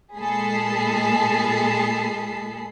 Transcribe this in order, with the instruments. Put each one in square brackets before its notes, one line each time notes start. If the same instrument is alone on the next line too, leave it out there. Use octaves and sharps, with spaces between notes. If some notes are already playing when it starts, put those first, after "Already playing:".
[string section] A#2 G#3 G#4 A4 B5 C7